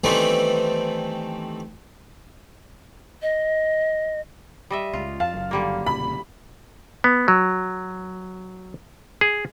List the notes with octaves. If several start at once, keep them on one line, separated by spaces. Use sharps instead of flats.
D#3 E3 G3 A3 B3 C4
D#5
G3 D#5 E5
C#2 C#3 F4
F2 F5 A5
F#1 F#3
D3 G3 A#3
E1 A#2 C#3 B5
B3
F#3
G#4